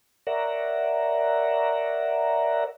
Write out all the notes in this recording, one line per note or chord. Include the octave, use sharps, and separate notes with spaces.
A#4 C#5 D5 E5 F#5 A#5